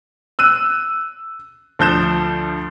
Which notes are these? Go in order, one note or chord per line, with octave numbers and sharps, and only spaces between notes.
E6 F#6 D#7
D2 F3 G6 E7